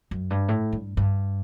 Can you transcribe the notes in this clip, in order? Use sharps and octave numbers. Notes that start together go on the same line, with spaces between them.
F#2
G2
A2
G2
G2